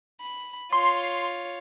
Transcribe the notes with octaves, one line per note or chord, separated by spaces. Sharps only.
B5
F4 C#5 C6